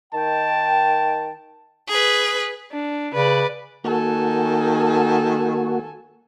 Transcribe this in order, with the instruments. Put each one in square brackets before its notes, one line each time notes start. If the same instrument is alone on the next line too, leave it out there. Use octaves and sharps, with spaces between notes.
[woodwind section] D#3 G5 [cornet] A5
[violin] G#4 B4
[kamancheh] D4
[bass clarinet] C#3 [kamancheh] B4 D5
[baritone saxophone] D#3 [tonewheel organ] A#3 F#4 [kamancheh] A4 G#5